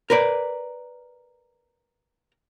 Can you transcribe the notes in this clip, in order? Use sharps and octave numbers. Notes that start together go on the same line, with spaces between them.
A#4 B4 D5